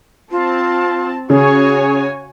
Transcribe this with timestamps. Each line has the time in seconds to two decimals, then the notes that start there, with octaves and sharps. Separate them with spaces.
0.31 C4 F4 A5
1.30 C#3 F#4 G#4 C#5 G#5